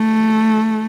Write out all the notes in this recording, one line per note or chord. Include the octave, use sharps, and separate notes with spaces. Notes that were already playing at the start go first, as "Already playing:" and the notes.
Already playing: A3